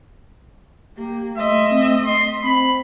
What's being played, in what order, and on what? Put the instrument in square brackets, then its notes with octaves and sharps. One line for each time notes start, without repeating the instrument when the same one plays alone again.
[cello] A#3 [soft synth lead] G4
[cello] A3 D#5 [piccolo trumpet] E5 [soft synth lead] C6
[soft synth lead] C4
[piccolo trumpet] C6 [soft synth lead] B6
[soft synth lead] C4 [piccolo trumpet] B5